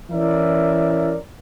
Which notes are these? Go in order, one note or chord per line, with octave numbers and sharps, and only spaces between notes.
E3 C#4 E4 A#4 D5 E5